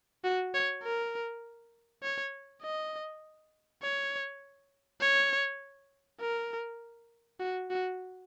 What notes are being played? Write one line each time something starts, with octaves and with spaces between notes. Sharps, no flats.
F#4
C#5
A#4
C#5
D#5
C#5
C#5
A#4
F#4
F#4